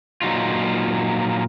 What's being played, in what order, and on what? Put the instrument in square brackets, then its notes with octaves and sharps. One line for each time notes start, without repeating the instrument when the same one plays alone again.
[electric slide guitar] A#2 F#3 D#4 F4